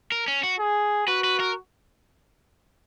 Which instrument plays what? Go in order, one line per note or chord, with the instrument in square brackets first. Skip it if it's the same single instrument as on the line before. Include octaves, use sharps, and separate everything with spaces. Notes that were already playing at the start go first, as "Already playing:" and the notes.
[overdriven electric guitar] A#4
C#4
F#4
[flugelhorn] G#4
[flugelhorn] F#4 [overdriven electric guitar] B4
[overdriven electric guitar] B4
A#4